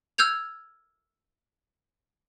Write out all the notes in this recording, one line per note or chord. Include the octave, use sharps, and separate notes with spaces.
E6 F6 G6 G#6 F7